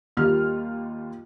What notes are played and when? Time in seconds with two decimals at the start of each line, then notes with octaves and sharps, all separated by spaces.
0.17 D#2 G3 A#3 F4 F6